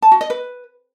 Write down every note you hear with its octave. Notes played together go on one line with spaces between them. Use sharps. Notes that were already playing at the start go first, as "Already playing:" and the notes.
A5
F#4
D#5
B4